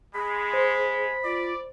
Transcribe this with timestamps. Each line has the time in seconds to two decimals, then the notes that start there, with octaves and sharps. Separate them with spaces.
0.14 G#3 G#4 B5
0.54 C5
1.24 F4 D5